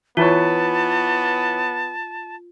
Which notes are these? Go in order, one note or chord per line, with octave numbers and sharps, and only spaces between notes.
E3 B3 F4 B4 C#5 A5